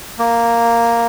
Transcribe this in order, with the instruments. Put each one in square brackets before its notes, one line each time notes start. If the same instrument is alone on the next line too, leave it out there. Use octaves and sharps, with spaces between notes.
[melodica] A#3